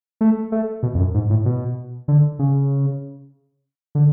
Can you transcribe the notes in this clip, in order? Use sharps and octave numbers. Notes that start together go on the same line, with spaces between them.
A3
A3
B2
F2
F#2
G#2
A2
B2
D3
C#3
D3